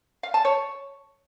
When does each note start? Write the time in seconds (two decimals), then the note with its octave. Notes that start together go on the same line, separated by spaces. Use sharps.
0.23 F5
0.34 A5
0.45 C#5